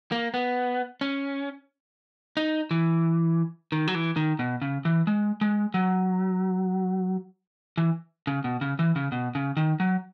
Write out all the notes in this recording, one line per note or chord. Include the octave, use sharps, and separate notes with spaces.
A#3
B3
C#4
D#4
E3
D#3
F#3
E3
D#3
B2
C#3
E3
G#3
G#3
F#3
E3
C#3
B2
C#3
E3
C#3
B2
C#3
D#3
F#3